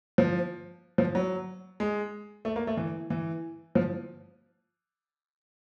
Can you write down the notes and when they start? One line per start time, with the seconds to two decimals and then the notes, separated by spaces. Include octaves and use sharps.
0.18 F3
0.98 F3
1.15 F#3
1.80 G#3
2.45 A3
2.56 A#3
2.67 A3
2.77 E3
3.10 E3
3.75 F3